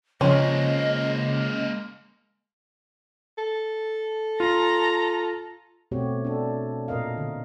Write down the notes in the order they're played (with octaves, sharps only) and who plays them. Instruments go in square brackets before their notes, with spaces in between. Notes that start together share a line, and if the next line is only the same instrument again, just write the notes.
[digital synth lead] C#3 [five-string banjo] F3 C#4 [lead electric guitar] G#3 A#3 [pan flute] D#5
[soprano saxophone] A4
[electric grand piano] F4 [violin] A#5
[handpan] B2 A3 C4 F#4 G4 C#5
D4 A4
A#2 A#4 D#5 F5
D3